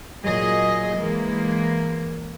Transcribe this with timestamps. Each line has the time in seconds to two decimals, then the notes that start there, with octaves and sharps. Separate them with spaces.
0.23 A#2 F#3 G#4 D#5
0.96 E3 G#3 A#3